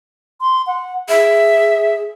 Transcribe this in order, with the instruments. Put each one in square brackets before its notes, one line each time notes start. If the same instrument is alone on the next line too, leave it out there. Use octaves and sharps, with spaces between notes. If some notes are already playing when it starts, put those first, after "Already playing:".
[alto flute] C6
F#5
[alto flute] G#4 [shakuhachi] E5